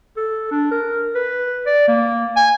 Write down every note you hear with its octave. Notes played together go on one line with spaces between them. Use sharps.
A4
D4
A#4
B4
D5
A#3
G#5